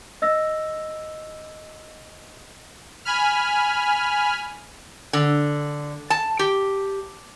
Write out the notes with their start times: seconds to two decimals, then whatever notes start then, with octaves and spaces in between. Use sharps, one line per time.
0.22 D#5 E6 A#6
3.05 G#5 B5 F6
5.13 D3
6.10 A5
6.39 G4